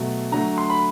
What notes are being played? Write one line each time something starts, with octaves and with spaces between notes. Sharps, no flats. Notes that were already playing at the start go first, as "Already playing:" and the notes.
Already playing: B2 F#3 A3
D3 F#3 A3 A#5
C6
B5